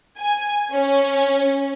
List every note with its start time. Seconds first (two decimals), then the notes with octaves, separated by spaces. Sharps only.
0.18 G#5
0.72 C#4